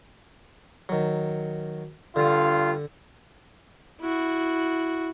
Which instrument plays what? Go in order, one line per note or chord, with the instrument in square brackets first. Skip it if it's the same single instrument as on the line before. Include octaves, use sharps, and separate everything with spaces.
[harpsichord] D#3 F#3
[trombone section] G2 F4 [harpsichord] D3
[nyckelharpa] E4 F#4